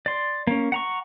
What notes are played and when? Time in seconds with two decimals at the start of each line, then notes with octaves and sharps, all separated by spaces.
0.06 D5 C6
0.47 A#3 C#4
0.72 F#5 A#5 C#6